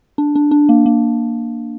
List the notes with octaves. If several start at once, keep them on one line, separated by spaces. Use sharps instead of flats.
D4
D4
D4
A#3
A#3